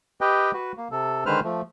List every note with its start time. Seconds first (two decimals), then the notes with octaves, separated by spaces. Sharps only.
0.21 G4 B4 D#5 G5
0.54 F#4 B4
0.77 A#3
0.91 C3 A4
1.26 D3 D#3 G#3 B4 C5 F6
1.44 F3 A3